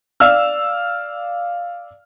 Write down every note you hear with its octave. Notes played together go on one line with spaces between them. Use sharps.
D5 F5 E6 F6